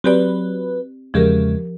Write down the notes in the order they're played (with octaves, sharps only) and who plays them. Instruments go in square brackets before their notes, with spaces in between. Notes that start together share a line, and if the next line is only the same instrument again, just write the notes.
[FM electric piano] F#3 B4 [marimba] C4 G4 D5
[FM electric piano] E2 C#3 G#3 [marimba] F3 G4 A#4